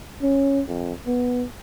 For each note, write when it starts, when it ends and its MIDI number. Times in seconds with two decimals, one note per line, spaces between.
0.22 0.62 61
0.67 0.93 41
1.07 1.44 59